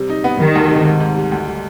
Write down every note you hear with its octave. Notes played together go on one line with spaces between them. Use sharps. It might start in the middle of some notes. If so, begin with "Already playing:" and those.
Already playing: C3 G3
D#4
B3
D#3 G3
D2
C3
G#2
G#2
G3
D2
G3